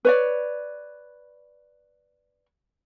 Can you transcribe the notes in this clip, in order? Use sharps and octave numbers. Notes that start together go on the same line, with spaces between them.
B4 C#5 D5